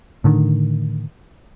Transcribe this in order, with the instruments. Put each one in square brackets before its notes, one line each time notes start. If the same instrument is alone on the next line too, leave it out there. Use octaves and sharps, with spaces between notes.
[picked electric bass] A2 D3 D#3